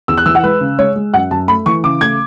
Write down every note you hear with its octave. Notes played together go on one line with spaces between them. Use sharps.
E2 E6
F#6
E3 E6
F#5
G#3 B4
C#3
G#3 C#5
G#3
F#2 F#5
F#2 A5
A3 B5
E3 C#6
C#3 D6
A3 G#6